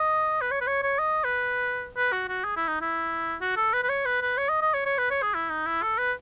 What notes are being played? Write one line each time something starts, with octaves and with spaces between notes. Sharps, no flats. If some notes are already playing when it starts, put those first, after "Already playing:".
Already playing: D#5
B4
C#5
B4
C#5
C#5
D#5
B4
B4
F#4
F#4
G#4
E4
D#4
E4
F#4
A4
B4
B4
C#5
B4
B4
C#5
D#5
D#5
C#5
C#5
B4
C#5
G#4
E4
D#4
E4
A4
B4